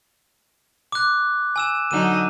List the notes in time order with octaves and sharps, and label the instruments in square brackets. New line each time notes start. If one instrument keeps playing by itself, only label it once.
[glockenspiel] D6 F#6
G#5 E6 E7
[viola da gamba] D3 F#3 D#4 [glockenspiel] D#7